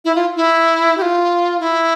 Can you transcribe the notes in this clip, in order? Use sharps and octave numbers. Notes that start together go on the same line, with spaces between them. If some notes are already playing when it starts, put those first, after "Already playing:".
E4
F4
E4
G4
F4
E4